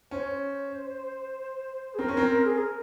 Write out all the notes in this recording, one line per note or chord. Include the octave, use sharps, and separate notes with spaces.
C#4 C5
C#5
C5
G#4
C4 A#4
C#4
C4
G#4
A#4